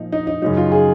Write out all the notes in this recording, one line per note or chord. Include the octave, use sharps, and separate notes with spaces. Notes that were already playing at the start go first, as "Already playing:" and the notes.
Already playing: A#2 F3 D#4
D#4
D#4
F#2 C#3 F#3 D#4
F4
G#4